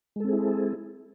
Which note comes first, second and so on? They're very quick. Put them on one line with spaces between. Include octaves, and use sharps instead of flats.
G#3 A4 C4 G#4 E4